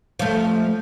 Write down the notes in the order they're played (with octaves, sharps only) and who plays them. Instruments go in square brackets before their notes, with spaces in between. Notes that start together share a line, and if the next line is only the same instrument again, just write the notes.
[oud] F3 A3